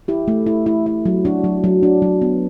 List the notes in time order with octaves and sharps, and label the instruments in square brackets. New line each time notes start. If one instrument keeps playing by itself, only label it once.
[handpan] E4 G4
A3
E4
E4
E4
F#3
D4 F#4
F#3
F#3
D4
F#3
B3